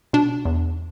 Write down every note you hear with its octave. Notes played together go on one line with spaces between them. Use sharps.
B2 D4
E2